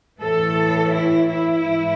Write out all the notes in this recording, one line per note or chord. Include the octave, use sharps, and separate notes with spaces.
A2 E3 A4
E4
E4
G#2 E3